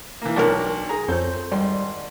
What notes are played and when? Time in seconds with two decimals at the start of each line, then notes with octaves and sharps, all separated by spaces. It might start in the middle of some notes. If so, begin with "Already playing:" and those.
0.22 E3 A#3
0.36 B1 D4 A#4 C#5
0.89 G#4 A#5
1.08 F2 A4 C5 C#5 G6
1.52 G#1 G3 C6